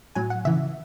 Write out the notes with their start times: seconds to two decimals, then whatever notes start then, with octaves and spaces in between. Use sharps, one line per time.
0.15 A2 F#3 G#5
0.30 F#5
0.45 C#3 E3 E5